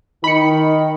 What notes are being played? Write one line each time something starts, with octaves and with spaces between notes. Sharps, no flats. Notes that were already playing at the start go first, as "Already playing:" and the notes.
D#3 D#4 B5 C#7